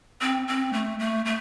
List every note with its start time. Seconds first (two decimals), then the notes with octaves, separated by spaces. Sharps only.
0.22 C4
0.48 C4
0.73 A3
0.99 A3
1.25 A3